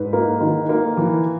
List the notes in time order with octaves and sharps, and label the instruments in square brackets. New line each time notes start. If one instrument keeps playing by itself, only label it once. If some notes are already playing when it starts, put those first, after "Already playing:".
Already playing: [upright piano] G#2 B4
A#3
D#3
A#3
E3